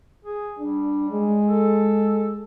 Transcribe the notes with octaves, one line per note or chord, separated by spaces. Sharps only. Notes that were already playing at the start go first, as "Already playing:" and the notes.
G#4
G3 D4
G#3
A4